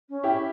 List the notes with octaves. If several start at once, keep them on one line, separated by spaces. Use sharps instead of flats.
C#4
E4 G4